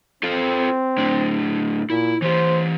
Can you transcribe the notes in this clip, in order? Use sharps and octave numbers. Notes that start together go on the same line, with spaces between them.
C4 F4 A4 F5
A2 D4
A#2 E4
E3 G4 C5